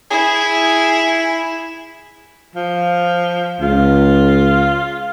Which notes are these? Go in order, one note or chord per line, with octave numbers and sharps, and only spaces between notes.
E4 G#4
F3
C#2 F4